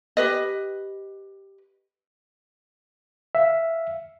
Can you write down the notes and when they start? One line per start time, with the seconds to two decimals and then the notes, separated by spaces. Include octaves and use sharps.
0.17 G4 B4 D#5
3.35 E5 F5